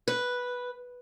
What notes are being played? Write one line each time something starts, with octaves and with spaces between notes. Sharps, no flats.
B4